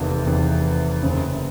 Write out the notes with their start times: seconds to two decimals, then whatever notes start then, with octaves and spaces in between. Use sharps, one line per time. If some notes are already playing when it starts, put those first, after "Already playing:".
Already playing: F1 E2 C3 D#3 A#3
0.26 F1 E2 C3 D#3
1.03 F#1 F#2 C#3 C4